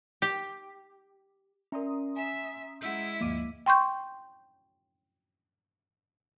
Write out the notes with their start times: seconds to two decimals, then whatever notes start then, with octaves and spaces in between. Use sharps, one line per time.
0.22 G4
1.72 C#4 A#4 D5 E5 A#5 C6 D#6
2.16 E5 G#5 E7
2.81 G#3 E4 F#5 E6 G6
3.21 D2 G2 F3 A#3 D#5 D6 D#7
3.66 G5 C6 C#6 G6